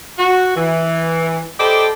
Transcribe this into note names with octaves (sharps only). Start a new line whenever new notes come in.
F#4
E3
G4 A4 C5 D5 D#5 B5